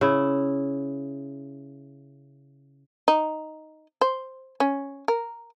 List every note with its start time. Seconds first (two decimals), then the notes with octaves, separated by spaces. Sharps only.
0.01 C#3 E4
3.08 D#4
4.01 C5
4.60 C#4
5.08 A#4